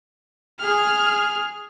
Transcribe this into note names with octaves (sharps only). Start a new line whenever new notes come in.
G#4 F6